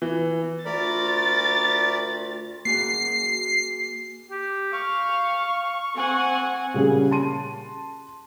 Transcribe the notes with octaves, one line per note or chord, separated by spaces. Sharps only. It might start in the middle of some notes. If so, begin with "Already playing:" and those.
E3
D2 A3 F4 A#4 D5 B5 A6
A#3 F#4 G#4 C7
G4
F5 C#6
C4 F#5 G#5
A#2 C#3 G3 C#4 G#4
A5 C6 D#7